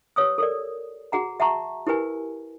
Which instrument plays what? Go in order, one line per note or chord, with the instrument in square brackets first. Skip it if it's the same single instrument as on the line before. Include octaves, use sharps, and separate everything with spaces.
[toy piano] G4 B4 C#5 D#6 E6
A4 A#4 D5
F#4 G#4 F#5 A#5
E5 F#5 A5 A#5 C#6
E4 G4 A#4 B4 G#5